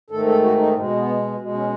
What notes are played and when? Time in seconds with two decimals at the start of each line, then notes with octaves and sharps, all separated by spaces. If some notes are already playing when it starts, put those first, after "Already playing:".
0.10 G#2 D#3 A3 A4
0.26 A4
0.42 F#4
0.58 D#4
0.74 B2 G#3
0.95 B3
1.38 B2 G#3
1.54 C#4